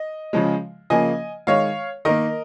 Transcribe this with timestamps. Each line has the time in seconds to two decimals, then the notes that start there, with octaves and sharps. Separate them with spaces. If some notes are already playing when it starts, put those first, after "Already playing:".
Already playing: D#5
0.33 C#3 F3 G#3
0.90 C#3 F3 A#3 D#5 G#5
1.47 D#3 G#3 C#5 F5
2.05 D#3 A#3 A#4 D#5